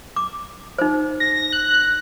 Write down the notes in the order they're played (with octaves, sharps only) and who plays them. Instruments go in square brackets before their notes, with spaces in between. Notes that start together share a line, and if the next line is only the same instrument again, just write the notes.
[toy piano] D6
D#4 C5
[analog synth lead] A#6
F#6